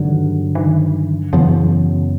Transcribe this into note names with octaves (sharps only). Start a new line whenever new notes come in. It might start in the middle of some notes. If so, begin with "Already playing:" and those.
Already playing: G2 D3 D#3 F#3
D#3
F#2 C#3 E3 F#3 B3